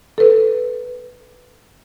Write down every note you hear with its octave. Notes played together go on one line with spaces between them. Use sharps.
A4 B4